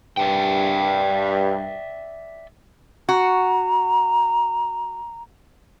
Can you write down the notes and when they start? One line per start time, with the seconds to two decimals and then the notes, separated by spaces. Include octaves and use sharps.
0.17 G2 D5 E5 G5
3.09 F#4 A#5